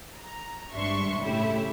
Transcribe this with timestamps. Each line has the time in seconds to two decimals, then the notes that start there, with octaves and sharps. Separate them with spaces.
0.18 A#5
0.74 G#1 G2 D4 E5 C6 C#6
1.21 A2 C#3 A3 E4 G4 E5